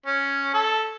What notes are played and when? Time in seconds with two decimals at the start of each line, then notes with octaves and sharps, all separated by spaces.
0.06 C#4
0.54 A4